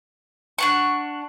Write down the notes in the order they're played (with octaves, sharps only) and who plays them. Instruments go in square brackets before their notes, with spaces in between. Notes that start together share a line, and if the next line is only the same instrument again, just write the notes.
[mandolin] D4 F#5 C#6